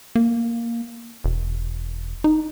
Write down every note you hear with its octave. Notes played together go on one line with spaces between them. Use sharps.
A#3
E1
D#4